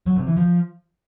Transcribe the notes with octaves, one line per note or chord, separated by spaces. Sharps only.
F#3
C3
E3
F3